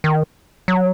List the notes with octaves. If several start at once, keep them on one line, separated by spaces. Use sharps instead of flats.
D#3
F#3